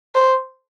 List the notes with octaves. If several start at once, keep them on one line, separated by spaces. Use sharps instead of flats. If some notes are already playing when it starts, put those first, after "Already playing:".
C5